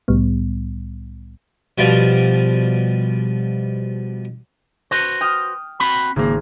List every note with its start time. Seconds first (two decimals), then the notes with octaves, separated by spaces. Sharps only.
0.08 C2 A2 G3 B3
1.78 B2 F3 G3 F5
4.91 F#4 B4 C5 A#6 B6 C#7
5.21 G5 D#6 F6
5.80 C4 F#4 B5
6.16 G#1 C#3 A#3